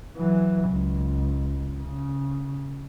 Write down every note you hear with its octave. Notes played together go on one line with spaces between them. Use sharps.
E3 F#3
C#2
C#3